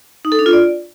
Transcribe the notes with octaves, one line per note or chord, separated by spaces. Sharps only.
D#4
A4
D4
F4
D5